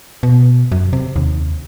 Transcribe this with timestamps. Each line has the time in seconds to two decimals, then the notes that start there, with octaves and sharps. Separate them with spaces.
0.23 B2
0.72 F#2
0.93 C3
1.16 D#2